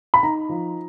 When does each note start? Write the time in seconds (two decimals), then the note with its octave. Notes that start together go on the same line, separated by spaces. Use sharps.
0.14 B5
0.23 D#4 A#5
0.49 F3